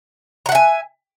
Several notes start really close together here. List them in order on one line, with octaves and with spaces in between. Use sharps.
A#5 F#5 E5 G#5